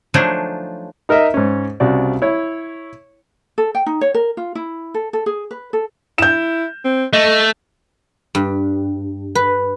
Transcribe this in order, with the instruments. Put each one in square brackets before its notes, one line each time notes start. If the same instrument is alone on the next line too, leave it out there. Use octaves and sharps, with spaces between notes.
[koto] F3 F#3 A3 D4 D#4 G#4
[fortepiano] D#4 A#4 D#5 E5
G#2 C#4
C2 C#3 F#4 D5
E4 C#5
[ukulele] A4
G5
D#4
C#5
A#4
F4
E4
A4
A4
G#4
B4
A4
[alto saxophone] E4 [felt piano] G6 E7
[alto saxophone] C4
[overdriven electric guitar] A3 [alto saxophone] D#5
[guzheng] G2
B4